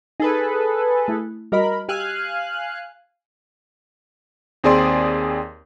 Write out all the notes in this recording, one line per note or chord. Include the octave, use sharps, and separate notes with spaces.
D#4 G#4 A4 B4
A3 E4
G3 F#4 A#4 D#5 B5
G4 F5 G#5 E6 F#6
D#2 C4 G#4 D5 C6